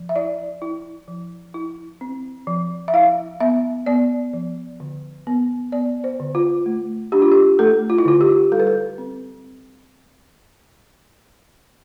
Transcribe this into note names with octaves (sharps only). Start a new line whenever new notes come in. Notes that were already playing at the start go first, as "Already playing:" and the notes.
Already playing: F3
E5
E4 D5
E4
F3
E4
C4
F3
E5
E4 F5
B3 E5
B3 D5
F3
D3
B3
B3 D5
C5
D3
F4
A3
D4 G4
F4
G4
A3 A4
F4
E4
D3 F4
G4
G3 A4
B4
A4
C4